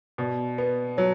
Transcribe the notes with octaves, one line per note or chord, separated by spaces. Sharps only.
B2 D5
B3
F#3 C#5